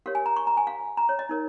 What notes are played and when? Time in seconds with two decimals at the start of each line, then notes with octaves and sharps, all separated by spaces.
0.06 G4 A#4 C#5 F5
0.15 G#5
0.26 A#5
0.36 C#6
0.47 A#5
0.57 G#5
0.67 F5
0.97 A#5
1.09 C#5
1.19 D#5
1.29 D#4 A#4 C#5